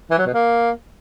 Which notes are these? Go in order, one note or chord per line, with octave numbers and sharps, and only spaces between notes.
E3
F#3
B2
A#3